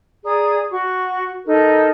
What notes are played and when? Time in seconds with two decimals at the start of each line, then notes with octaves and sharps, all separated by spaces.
0.24 G#4 D5 A#5 D#6
0.71 F#4 C#6
1.46 D#4 A4 A#4